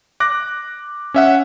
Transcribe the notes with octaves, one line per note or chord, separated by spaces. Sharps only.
D6 F#6 A#6
C#4 E5 F#5